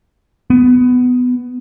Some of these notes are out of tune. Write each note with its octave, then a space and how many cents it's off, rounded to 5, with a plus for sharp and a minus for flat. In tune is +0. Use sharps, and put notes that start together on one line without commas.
B3 +15